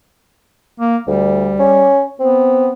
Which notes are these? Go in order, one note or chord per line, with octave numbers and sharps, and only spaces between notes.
A#3
D2 G3
C#4
B3 C4